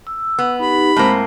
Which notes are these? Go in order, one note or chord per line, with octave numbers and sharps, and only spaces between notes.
E6
B3
D#4 G4 B5
A2 G#3 A#3 C4 C5